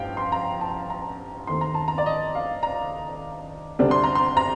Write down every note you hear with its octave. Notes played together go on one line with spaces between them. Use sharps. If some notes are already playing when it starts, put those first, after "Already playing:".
Already playing: A1 G2 F3 F5 G5
C6
A#5
A5
A#5
D#2 D#3 A3 C4 C6
A#5
A5
A#5
D5
D#5
F5
A#5
D2 C3 G3 D4
C6
A#5
C6
A#5